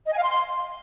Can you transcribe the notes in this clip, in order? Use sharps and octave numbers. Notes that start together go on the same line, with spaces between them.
D#5
G#5
F5
C6